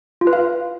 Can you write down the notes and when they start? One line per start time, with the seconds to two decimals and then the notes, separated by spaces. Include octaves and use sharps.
0.21 F4
0.27 B4
0.33 F5